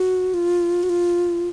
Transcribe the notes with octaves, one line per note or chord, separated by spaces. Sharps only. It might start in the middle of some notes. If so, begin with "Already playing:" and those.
Already playing: F#4
F4
F#4
F4